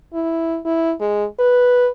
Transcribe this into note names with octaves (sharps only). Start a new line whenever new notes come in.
E4
E4
G#3
B4